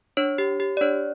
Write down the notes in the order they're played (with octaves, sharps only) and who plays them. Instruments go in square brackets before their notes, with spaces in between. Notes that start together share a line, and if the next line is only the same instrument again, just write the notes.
[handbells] D4 C#5
G4
G4
D5
D4 C#5